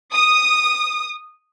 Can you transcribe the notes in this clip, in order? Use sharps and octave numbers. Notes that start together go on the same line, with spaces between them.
D#6